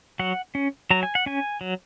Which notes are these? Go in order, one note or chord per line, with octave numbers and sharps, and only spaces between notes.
F#3 F#5
C#4
F#3 A#5
G#5
F#5
C#4 G#5
F#3